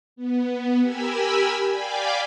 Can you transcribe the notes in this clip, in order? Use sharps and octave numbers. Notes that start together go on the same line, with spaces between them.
B3
G4 A#4 G#5 B5 E6
D5 F5 G5 G#5 B5 D6